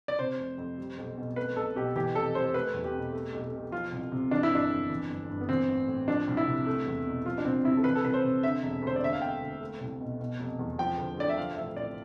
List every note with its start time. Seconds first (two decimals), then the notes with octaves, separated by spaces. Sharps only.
0.08 D5
0.19 C3 C5
0.39 F1
0.58 F2
0.78 G3
0.98 B1
1.18 B2
1.36 A3 B4
1.56 B1 A4
1.76 B2 G4
1.95 E3 G4
2.15 F1 A4
2.35 F2 C5
2.54 A3 B4
2.74 E2
2.84 G4
2.94 B2
3.13 A3
3.33 B1
3.52 B2
3.72 F3 F4
3.92 C2
4.12 C3
4.31 E3 D4
4.43 E4
4.51 G1 D4
4.70 F2
4.90 E3
5.09 G1
5.29 G2
5.41 B3
5.49 E3 C4
5.69 A1
5.88 A2
6.08 F3 D4
6.27 C2
6.37 E4
6.47 C3
6.66 A3
6.86 E2
7.06 B2
7.25 F3 F4
7.38 D4
7.45 C2 C4
7.65 C3 E4
7.77 A4
7.84 E3 B4
7.95 A4
8.04 C2 B4
8.14 C5
8.24 C3
8.43 D3 E5
8.63 E1
8.82 D2 C5
8.96 D5
9.02 D3 E5
9.13 F5
9.22 E1 G5
9.41 D2
9.61 A3
9.81 C2
10.00 B2
10.20 B2
10.39 F1
10.59 E2
10.78 F3 G5
10.98 D2
11.18 D3 D5
11.29 E5
11.37 F3 F5
11.57 A1 E5
11.76 A2 D5